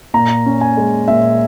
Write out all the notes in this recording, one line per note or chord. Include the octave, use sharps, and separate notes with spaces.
A#2 A#5
C#4
G#5
G#3
A#2 E5